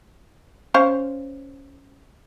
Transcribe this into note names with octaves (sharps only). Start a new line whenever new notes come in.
C#4 C5 F5